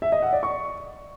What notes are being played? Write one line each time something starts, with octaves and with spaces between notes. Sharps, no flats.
E5
D#5
F#5
D5
C#6